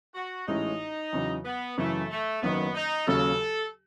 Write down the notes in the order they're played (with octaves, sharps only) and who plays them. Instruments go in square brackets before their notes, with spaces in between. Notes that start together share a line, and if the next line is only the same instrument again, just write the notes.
[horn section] F#4
[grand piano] A1 A2 G#3 C#4 [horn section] D#4
[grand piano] E2 C#3 F#3
[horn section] B3
[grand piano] F#2 C#3 E3 [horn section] A3
[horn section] A3
[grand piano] F#1 F#2 D#3 [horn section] B3
[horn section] D#4
[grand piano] D#2 C#3 F#3 [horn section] A4